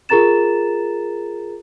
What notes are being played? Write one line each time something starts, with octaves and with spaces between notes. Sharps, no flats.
F4 G#4 A#4 A#5 A6 E7